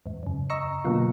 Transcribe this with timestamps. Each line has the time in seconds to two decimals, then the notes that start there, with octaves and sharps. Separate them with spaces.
0.06 E2 G#2
0.23 F#2 C#3
0.50 D#5 A#5 C#6 E6 C#7
0.84 B2 D3 F#3 A#3 B3 F4